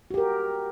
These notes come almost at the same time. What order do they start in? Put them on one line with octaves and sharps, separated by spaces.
F#4 G4 A#4